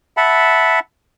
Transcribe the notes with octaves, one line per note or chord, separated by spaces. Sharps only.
E5 F#5 A5 B5